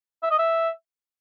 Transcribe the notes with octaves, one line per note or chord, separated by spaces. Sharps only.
E5
D#5
E5